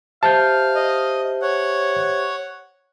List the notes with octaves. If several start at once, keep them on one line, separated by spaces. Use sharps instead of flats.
G4 C5 E5 F5 A5 F6 G6
D#5
C#5 F#5